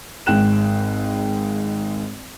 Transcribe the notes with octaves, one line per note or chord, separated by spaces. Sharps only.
G#1 G#2 G5 F#6 E7